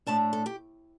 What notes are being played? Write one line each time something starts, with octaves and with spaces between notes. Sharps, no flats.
A2 A3 D4 A5
A4
G4